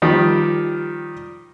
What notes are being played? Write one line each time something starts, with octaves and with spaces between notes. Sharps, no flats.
D#3 F3 G3